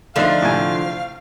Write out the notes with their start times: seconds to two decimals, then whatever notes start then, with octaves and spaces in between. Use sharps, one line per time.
0.16 D3 F3 A3 D4 D#4 F5
0.42 A2 C3 G#5